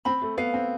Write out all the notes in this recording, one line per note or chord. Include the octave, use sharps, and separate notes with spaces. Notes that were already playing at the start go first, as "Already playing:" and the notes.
C4 B5
A3
B3 F5
C4